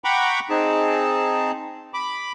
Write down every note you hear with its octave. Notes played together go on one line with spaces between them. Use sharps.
F#5 G5 A#5 B5 C#6 D6
C4 D#4 G#4 A5
B5 D6